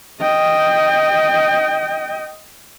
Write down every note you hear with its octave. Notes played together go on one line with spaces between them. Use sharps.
D#5 G5